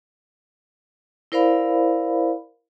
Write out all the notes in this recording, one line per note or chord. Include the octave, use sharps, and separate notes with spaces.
E4 A#4 C5 D5 F5 B5